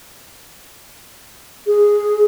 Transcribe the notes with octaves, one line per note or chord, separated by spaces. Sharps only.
G#4